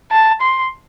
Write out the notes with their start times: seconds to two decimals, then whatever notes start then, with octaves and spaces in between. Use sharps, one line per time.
0.12 A5
0.41 C6